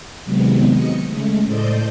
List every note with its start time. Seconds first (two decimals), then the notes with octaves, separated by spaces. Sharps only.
0.25 C3 D#3 F#3 G#3 B3 C4
0.71 D#5 C#7
1.07 C#3 G#3 A3
1.45 A2 A4 C5 D5 D#5 G6